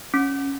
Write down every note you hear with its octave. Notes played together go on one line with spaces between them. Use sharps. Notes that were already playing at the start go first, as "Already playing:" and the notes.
C#4